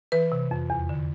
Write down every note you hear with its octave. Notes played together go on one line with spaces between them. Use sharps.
E3 B4
C3
F2
E2
D3